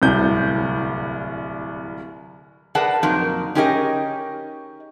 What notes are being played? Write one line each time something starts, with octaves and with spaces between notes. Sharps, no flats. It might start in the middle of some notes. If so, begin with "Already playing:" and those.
D1 C2 G6
G#4 A#4 B4 D5 F#5 A5
F2 A#2 F#3 D#4 A#4
C#4 D#4 G4 G#4 A#4 D#5